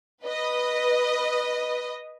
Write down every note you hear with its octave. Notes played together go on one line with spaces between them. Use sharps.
B4 D#5